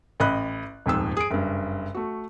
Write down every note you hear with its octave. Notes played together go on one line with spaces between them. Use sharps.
A1 D#5 B5 F#6
D#1 F2 G#2 E6
G#4 D7
F#1 G2
A3 F#4